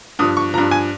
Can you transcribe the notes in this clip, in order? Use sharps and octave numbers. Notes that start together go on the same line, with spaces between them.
G2 F3 D#6
C#6
G2 F3 A#5
G#5